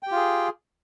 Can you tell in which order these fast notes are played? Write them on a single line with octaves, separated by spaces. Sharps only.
G5 G4 F4 G#4